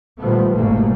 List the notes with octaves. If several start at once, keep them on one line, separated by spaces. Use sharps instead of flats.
A#2 D#3 F3 G3 A3 B3
G1 C2 G#2 B2 A3 A#3